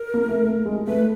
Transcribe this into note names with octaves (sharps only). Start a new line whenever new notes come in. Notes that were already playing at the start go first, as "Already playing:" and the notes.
Already playing: A#4
A#3
A3
A3
G#3
A3 B4